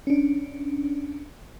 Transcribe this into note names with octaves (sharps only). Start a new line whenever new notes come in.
C#4 D4